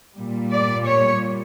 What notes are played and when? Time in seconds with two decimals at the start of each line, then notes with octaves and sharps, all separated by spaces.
0.15 A#2 G3
0.51 D5
0.86 C#5